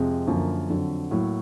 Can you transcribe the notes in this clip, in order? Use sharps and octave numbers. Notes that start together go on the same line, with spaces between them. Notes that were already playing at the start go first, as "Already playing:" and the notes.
Already playing: F2 C3 G#3
F#2 D3 F3 A#3
F2 D3 F#3
A2 F#3 A#3